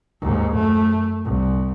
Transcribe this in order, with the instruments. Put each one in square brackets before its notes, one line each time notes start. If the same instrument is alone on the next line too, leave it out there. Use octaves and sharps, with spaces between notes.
[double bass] D#2 G#2
F#2 A3
C2